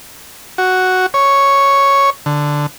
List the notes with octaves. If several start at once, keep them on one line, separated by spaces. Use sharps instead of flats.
F#4
C#5
D3